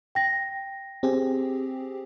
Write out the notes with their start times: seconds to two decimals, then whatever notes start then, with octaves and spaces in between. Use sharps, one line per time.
0.15 G5 A#6
1.03 C4 G4 G#4